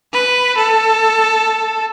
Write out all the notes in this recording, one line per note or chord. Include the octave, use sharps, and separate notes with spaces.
B4
A4